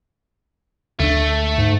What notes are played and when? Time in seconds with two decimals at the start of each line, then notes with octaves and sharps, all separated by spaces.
0.99 D2 A3 D4
1.58 G#2